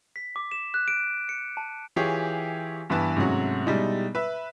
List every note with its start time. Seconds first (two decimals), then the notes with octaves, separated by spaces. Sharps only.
0.16 B6
0.36 D6
0.51 E7
0.74 F#6
0.88 D7
1.29 C#7
1.57 A5
1.96 E3 F4 G4 G#4 C#5
2.90 G2 E3 B3 B4 A5 E6
3.16 G#2 C3 F#3 A3 C#4 F#4
3.66 B2 G3 G#3 D#4 E4
4.15 B4 E5